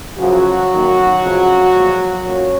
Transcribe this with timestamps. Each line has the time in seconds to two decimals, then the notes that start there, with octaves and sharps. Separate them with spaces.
0.18 F#2 C#3 F3 F#3 F#4
0.70 F#2 D#3 A#3
1.22 F2 C#3 F3
1.73 A#2 F3 G#3
2.26 A#2 F#3 A#3 C#4 C#5